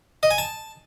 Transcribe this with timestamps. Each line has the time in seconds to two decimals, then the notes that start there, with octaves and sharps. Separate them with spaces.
0.23 D#5
0.31 G#5
0.38 A5